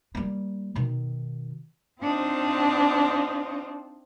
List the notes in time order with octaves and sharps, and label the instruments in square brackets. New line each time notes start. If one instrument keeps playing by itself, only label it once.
[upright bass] G3 A#3
B2 D#3
[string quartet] C4 D4 D#4 F4 C5